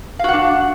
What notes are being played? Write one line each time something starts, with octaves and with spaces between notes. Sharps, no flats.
D4 F#4 F5 F#5